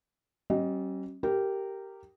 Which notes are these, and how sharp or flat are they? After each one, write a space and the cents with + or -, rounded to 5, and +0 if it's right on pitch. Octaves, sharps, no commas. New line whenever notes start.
G3 -40 C#4 -35 D#5 +0
G4 -10 A#4 -15